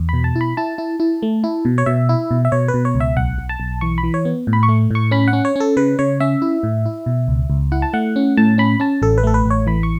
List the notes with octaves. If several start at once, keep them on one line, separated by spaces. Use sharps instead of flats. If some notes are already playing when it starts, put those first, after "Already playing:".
Already playing: E2
B2 B5
A5
E4
B5
E4 A5
E4
E4
A3
E4
B2
C#5
B2 E5
E4
B2
E5
B2 C#5
B4
B2
C#5
C#2
E5
B1 F#5
B1
A5
B1
E3 C#6
B5
E3
C#5
B3
A2
B5
C#6
A3
A2 C#6
C#4 B5
F#5
C#4
C#5
C#4 A4
C#3 B4
C#3 C#5
C#4 E5
E4
A2
E4
B2
C#2
C#2
E4 F#5
A5
A3 F#5
C#4
A2 A5
C#4 B5
C#4 A5
A1 A4
B4
A3 A4
B4
A1 C#5
E3 B5
C#6